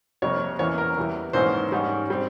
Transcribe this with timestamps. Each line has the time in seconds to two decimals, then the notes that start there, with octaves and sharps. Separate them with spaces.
0.22 F2 C3 G3 A#3 C#5
0.59 E2 E3 A#3 C#4 C#5
0.78 A#4
0.96 E2 E3 G3
1.33 G#1 G#2 E3 A#3 C#4 C5
1.72 G#2 G3 C#4
2.10 G3 C4